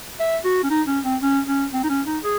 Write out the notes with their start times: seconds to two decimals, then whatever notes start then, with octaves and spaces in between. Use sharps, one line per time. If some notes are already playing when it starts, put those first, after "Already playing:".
0.20 E5
0.44 F#4
0.63 C#4
0.70 D#4
0.88 C#4
1.04 C4
1.22 C#4
1.47 C#4
1.73 C4
1.84 D#4
1.90 C#4
2.07 D#4
2.24 G#4